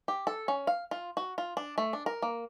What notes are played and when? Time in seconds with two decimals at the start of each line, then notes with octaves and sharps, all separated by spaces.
0.08 G4
0.27 A4
0.48 C#4
0.67 F5
0.91 F4
1.17 F#4
1.38 F4
1.57 D4
1.78 A3
1.93 D4
2.06 A#4
2.22 A#3